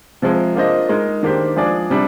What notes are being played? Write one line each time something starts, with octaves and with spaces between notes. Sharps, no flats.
C3 F3 G#3
A#3 D4 F4 C5 D#5
G#3 D#4 A#4
D#3 A#3 D4 G4 C5
F3 G#3 D4 G#4 D5
C3 G3 D4